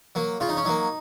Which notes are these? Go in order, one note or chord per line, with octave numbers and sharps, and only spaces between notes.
F#3 A#3
C#3 F4
D#4
C#4
F#3 A#3 D#4